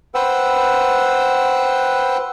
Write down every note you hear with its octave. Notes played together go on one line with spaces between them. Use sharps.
B4 C5 F#5 G5 E6